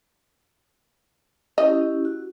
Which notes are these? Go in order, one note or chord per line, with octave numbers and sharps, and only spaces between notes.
C#4 E4 G4 D#5
F#4